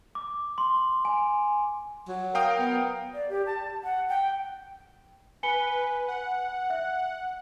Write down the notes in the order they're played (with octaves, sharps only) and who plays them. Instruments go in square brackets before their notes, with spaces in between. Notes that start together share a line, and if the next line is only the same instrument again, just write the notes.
[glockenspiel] D6
C6
G#5
[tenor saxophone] F#3
[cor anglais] A#4 [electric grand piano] F5 G5 D#6
[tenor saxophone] B3
[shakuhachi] D5
G4
A5
F#5
G5
[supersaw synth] B4 [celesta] G#5 C#7 G7
[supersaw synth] F#5
[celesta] E5 F#6